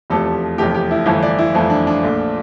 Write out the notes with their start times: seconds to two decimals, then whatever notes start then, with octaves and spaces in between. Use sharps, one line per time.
0.10 F1 E2 C3 F3 A3 A4
0.58 F1 E2 C3 F3 A3 G4
0.75 G4
0.91 E4
1.06 G1 F2 E3 A3 E4
1.23 D5
1.39 E4
1.54 G1 F2 E3 A3
1.70 D4
1.87 D4
2.03 A#1 A#2 A3